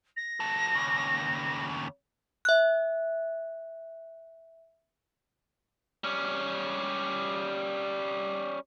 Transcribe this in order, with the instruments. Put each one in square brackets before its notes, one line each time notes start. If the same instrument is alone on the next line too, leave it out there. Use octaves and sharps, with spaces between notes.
[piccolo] A#6
[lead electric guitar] F#3 A4
D#2 C#3
[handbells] E5 F#6
[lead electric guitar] G3 C#4